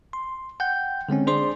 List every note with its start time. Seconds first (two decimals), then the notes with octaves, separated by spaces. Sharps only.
0.13 C6
0.60 F#5 G5 G6
1.09 D3 G#3 C4 C#4
1.27 D4 G#4 C5 D5 C6